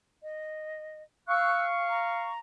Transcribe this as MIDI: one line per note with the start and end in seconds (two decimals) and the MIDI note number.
0.22 1.02 75
1.29 2.33 77
1.29 2.33 85
1.29 1.65 88
1.29 1.65 90
1.88 2.39 82